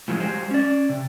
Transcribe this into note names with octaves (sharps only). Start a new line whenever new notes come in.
A2 E3 F3 G3 G#3
F#3 G#3 G4 C5
C#4 D5
C3